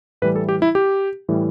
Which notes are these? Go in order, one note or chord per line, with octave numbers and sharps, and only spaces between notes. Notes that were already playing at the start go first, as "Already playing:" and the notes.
A2 E3 G3 B4
A4
G4
E4
G4
A2 E3 G3